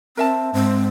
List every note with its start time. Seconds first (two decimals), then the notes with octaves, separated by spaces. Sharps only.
0.17 C4 A#4 E5 A5
0.53 G#2 C4